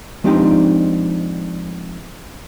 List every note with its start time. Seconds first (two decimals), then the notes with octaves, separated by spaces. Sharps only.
0.24 F3 G#3 C4 D4 D#4 G4